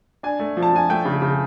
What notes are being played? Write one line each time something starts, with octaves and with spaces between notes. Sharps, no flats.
D4 G#5
A3
F3
A5
F3 G#5
A3 G5
C#3
C#3